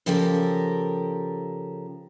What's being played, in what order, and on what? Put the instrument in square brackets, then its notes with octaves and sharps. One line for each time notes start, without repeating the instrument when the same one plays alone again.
[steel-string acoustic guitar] C#3 F3 G4 A4 A#4